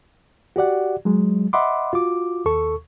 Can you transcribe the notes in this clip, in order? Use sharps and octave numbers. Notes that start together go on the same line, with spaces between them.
F#4 G4 D5 F#5
F#3 G#3
D#5 E5 F#5 B5 C6 D6
F4 F#4 D6
D#2 A4 C#6